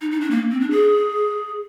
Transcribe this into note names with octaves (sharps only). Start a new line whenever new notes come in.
D#4
D#4
D4
A#3
C4
D4
G#4